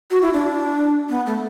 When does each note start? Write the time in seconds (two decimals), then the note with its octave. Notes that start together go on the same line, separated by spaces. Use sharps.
0.11 F#4
0.22 E4
0.33 D4
1.10 B3
1.26 A3